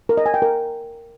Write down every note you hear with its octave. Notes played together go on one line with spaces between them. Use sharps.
A#4
D#5
G#5
G5
A#4